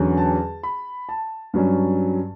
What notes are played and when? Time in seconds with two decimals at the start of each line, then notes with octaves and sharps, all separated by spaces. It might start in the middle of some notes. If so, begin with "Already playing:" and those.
Already playing: E2 D3 F#3 C#4
0.17 A5
0.63 B5
1.09 A5
1.54 G2 F#3 C#4